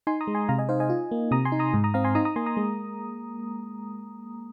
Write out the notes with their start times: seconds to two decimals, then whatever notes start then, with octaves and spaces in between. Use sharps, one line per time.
0.07 D#4 G#5 C6
0.21 A#5 D#6
0.27 G#3
0.35 G#5 C6
0.49 C3 F5 A#5
0.58 D#5 G#5
0.69 D#4 C5 F5
0.80 D#5 G#5
0.90 F4
1.11 A#3
1.31 C3 A#5 D#6
1.45 G#5 C6
1.52 D#4
1.59 A#5 D#6
1.74 G#2
1.84 A#5 D#6
1.94 C4 F5 A#5
2.04 G#5 C6
2.15 D#4 A#5 D#6
2.25 A#5 D#6
2.36 A#3 G#5 C6
2.46 A#5 D#6
2.57 G#3